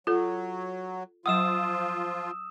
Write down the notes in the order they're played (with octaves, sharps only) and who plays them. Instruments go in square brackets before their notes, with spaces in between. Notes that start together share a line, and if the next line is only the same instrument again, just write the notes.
[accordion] F#3 [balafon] F4 A4
[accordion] F3 F4 [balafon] F#3 F#5 [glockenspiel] D#6 E6 E7